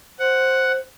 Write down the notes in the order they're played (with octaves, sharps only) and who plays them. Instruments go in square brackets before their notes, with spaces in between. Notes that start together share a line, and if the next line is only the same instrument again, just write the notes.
[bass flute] C5 [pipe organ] F#5